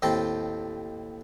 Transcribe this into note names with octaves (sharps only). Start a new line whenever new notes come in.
D#2 A2 C4 G5 A5